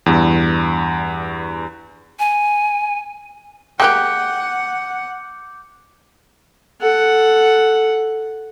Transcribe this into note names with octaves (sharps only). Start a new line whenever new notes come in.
E2 G2
G#5
G#3 A#3 G4 F#5 G5 D6 F#6 G6
A4 F#5